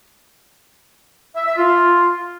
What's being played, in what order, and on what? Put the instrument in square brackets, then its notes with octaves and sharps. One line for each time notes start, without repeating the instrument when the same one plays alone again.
[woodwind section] E5
E5
F4